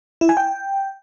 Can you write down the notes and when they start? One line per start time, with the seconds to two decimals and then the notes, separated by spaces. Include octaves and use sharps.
0.21 E4
0.29 G#5
0.37 G5